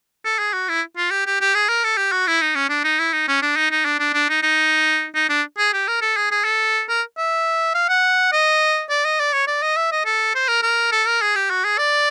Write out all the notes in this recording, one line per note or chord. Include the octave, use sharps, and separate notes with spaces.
A4
G#4
F#4
E4
F4
G4
G4
G4
G#4
A#4
A4
G4
F#4
E4
D#4
C#4
D4
D#4
E4
D#4
C#4
D4
D#4
D#4
D4
D4
D4
D#4
D#4
D#4
D4
G#4
G4
A#4
A4
G#4
G#4
A4
A#4
E5
F5
F#5
D#5
D5
D#5
D5
C#5
D5
D#5
E5
D#5
A4
C5
A#4
A#4
A4
A#4
G#4
G4
F#4
G#4
D5